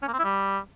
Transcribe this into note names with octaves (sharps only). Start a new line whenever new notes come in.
C#4
A#3
C4
E4
G3